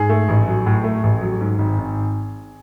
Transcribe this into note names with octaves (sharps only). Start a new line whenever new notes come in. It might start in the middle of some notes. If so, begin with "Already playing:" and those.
Already playing: G#2 G#4
A3
A1
F#3
A2
A3
A1
F#3
G#2
G#1
G#1